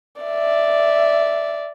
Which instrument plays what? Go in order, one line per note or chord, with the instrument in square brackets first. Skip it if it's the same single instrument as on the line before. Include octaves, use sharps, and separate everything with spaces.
[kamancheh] D5 E5